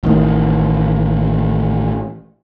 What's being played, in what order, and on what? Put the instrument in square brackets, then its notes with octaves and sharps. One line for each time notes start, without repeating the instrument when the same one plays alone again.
[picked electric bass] A1 A2 D#3